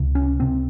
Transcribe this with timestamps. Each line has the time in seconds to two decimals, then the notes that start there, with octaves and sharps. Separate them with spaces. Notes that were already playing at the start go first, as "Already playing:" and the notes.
Already playing: C#2 C3
0.15 C#4
0.40 C#2 C3 C4